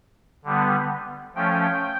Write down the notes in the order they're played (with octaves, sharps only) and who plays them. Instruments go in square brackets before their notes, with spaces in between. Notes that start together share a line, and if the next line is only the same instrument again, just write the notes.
[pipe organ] D3 G3 B3
F3 A3 C#4 G5